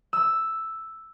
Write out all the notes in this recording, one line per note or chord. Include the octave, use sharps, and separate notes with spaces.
E6